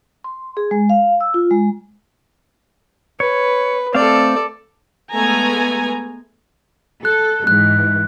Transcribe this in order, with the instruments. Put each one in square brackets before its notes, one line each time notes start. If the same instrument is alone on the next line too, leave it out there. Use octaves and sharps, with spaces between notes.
[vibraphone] C6
G#4
G#3
F5
E6
F4
G#3
[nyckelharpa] B4 [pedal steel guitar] C#5
[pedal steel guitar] A3 C4 F5 [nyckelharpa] A4 D5
[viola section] G#3 A3 B3 G#5 A#5
[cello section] A4 [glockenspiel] F#6
[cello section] G#2 E3 G#3 [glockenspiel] F#6